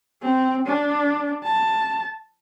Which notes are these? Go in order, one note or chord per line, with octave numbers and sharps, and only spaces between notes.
C4
D4
A5